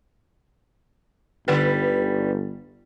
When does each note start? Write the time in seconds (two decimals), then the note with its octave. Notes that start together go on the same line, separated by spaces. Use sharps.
1.48 G1 D3 G3 B4